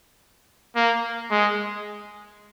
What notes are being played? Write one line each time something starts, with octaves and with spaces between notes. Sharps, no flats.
A#3
G#3